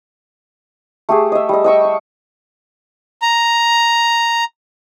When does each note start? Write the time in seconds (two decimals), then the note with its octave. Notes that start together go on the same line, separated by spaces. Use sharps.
1.09 A3 G4 G#4
1.32 D#5 E5
1.49 G3 D#5
1.64 D#5 G5 C#6 E6
1.85 F5
3.22 A#5